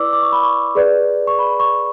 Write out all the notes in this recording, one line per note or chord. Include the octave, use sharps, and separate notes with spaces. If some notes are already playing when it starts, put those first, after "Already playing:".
Already playing: E4 B4 D5 D6 E6
D6
C#6
B5
C#6
G#4 B4 D5
C#6
B5
C#6